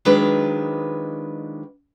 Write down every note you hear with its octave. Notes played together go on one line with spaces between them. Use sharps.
D#3 F3 F#3 G#3 D4 B4